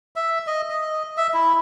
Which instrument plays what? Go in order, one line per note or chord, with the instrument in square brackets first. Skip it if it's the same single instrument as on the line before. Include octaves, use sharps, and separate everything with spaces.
[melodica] E5
D#5
D#5
E5
E4